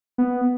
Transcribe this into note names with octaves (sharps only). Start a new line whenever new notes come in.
B3